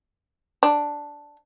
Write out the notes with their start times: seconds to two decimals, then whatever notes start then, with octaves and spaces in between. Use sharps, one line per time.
0.63 D4